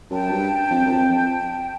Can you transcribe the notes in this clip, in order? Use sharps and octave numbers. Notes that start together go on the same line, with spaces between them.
F#2 G5 A5
G2
F2
F#2
F2
F2